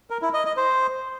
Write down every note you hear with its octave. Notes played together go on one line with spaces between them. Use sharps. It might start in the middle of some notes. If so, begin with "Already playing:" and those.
A#4
E4
D#5
D#5
C5